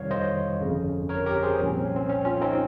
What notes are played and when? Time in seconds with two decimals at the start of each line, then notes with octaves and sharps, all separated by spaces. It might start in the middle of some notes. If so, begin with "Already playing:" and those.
Already playing: F2 C3 D#3 G3 C#5 F5
0.11 C5 D#5
0.60 G1 F2 C#3
1.09 A#4 C#5
1.26 G4 A#4
1.43 G#4 C5
1.59 C2 A#2 F3 C#4
1.72 C4
1.84 C#4
1.96 C4
2.09 C#4
2.25 C#4 F4
2.42 C4 D#4